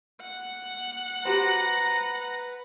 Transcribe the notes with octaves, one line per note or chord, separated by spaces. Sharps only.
F#5
F#4 G4 B4 C5 A#5